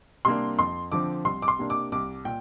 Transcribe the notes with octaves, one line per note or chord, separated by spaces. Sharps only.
C3 G3 A#3 D4 C6
F2 C6
D3 F3 C4 D6
C2 C6
D6
C6
C3 A#3 D4
D6
C2 D6
A#2 G5